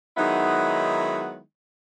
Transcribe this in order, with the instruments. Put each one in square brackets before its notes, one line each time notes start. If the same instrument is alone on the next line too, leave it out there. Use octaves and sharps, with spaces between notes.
[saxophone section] D#3 F#3 G#3 B3 D#4 E4